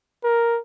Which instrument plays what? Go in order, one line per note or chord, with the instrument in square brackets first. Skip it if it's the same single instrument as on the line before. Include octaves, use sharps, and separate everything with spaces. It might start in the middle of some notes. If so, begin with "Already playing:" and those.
[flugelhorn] A#4